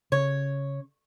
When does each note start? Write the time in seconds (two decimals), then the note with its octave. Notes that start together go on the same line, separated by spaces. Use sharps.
0.12 C#3 C#5